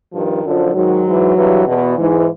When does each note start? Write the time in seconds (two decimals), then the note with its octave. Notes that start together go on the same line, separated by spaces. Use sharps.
0.13 G2 D#3 F3
0.44 F#2 D3 F3
0.74 G#2 D#3 F#3
1.05 G#2 E3
1.35 G2 E3
1.66 E2 B2
1.97 G#2 E3